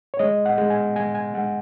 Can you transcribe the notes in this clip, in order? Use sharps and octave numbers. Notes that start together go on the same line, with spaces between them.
C#5
G#3 D#5
F#5
G#3
G#5
G#3 G#5
G#5
G#3 F#5